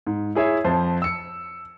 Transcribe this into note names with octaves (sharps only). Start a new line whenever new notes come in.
G#2
E4 G#4 C#5 E5
F2 C5 A5
E6 C#7